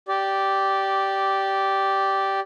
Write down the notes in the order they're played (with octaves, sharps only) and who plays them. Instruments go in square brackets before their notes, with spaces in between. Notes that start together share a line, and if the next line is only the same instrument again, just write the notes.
[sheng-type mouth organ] G4 D5